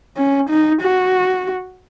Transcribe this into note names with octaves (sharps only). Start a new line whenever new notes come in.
C#4
D#4
F#4